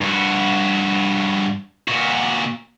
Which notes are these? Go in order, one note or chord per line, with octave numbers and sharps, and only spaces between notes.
G2 F#4
A#2 F#4